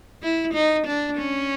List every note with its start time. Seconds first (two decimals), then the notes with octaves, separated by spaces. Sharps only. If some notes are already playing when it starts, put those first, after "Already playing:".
0.22 E4
0.54 D#4
0.87 D4
1.18 C#4